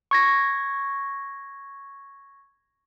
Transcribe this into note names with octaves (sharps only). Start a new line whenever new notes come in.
C#6 G#6 A#6